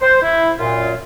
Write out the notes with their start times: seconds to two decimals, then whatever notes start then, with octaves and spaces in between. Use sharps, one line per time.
0.01 C5
0.22 E4
0.59 F#2 A#2 F4